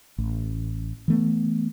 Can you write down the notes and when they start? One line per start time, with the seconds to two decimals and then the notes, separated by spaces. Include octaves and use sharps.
0.18 A1
1.08 E3 A3 B3